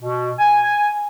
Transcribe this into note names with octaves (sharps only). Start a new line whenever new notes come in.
B2
G#5